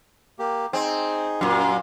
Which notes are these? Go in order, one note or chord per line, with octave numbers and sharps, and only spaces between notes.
A#3 G4
C4 D#4 G#4
F#2 A#2